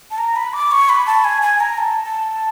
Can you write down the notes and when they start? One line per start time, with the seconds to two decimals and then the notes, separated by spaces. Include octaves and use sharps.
0.11 A5
0.18 A#5
0.36 B5
0.53 D6
0.71 C#6
0.89 B5
1.07 A5
1.24 G#5
1.42 G#5
1.60 A#5
1.78 A5
2.04 A5